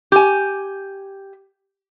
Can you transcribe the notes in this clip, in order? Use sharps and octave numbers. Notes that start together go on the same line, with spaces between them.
G4 G#5